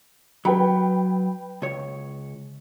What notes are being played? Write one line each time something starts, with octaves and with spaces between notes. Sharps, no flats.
F#3 B4 G5 B5
C#2 C#5